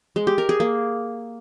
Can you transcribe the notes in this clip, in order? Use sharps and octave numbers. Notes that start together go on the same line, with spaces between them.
G#3
G4
A#4
G#4
A#3